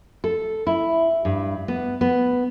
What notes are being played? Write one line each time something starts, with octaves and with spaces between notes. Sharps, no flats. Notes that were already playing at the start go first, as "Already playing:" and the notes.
A4
E4
G2
B3
B3